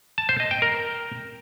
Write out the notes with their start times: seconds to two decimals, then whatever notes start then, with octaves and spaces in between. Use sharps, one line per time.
0.18 A5
0.29 C5
0.40 D#5
0.51 G5
0.62 A#4